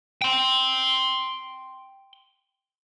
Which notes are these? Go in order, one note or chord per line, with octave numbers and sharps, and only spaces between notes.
G5 C6